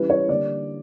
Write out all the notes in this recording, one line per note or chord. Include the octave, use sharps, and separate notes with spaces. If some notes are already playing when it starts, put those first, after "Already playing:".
Already playing: E3 G3 C#4 E4 B4
C#5
D3 G3 A#3 D5